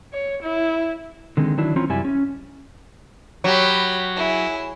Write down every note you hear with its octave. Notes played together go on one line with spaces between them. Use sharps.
C#5
E4
D3 D#3 G#3 C4
D#3 E3 F#3 D4 E4
E3 C4 C#4 F4 A#5
F#2 C3 G3 E4 G#5
C#4
F#3 G4 B5
E4 G#4